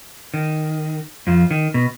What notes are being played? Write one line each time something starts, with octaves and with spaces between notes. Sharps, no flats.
D#3
F2 F3
D#3
B2